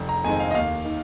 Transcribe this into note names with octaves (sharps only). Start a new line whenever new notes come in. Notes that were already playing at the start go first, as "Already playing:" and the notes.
Already playing: F1
A#5
F2 D#3 G#3 C4 G#5
F5
D#5
D#2 F5
D#3